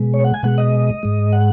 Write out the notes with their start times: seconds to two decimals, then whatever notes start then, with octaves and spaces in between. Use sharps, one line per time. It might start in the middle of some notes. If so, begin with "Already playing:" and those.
Already playing: B2 G#3
0.14 C#5
0.24 F#5
0.34 G#5
0.43 B2 G#3 F#5
0.58 D#5
1.03 G#2 G#3
1.33 F#5